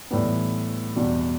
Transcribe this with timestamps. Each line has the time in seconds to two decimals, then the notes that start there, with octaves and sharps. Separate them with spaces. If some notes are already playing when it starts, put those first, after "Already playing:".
0.11 A2 E3 G3 B3
0.96 E2 B2 G3